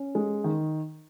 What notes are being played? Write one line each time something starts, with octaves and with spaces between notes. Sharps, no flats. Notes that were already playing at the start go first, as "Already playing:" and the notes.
Already playing: C#4
G#3
D#3